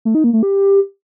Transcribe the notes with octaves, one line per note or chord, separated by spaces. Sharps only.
A3
D#4
A#3
A3
G4